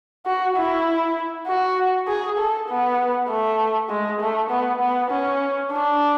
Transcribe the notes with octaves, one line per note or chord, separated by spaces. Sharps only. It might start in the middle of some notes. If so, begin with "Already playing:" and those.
F#4
E4
F#4
G#4
A4
B3
A3
G#3
A3
B3
B3
C#4
D4